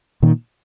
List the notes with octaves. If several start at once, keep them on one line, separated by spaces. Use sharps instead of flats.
A#2 D#3